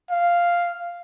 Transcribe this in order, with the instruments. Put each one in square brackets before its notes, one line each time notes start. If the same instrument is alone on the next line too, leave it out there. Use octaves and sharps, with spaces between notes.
[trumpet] F5